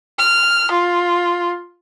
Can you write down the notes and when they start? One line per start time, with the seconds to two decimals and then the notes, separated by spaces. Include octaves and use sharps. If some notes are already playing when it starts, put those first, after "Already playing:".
0.18 F6
0.71 F4